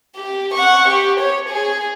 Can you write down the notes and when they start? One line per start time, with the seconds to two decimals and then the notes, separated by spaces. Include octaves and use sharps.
0.16 G4
0.54 F#5 C#6
0.88 G4
1.19 C#5
1.49 G#4